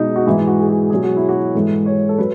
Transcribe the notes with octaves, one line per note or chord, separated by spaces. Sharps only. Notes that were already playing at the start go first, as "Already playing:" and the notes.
Already playing: B2 G#3 D#4
F#4
G#2 E3 G#3 E4
F#4
G#4
F#4
B2 F#3 G#4
F#4
E4
F#4
G#2 E3 G#3 A4
C#5
A4
F#3 B4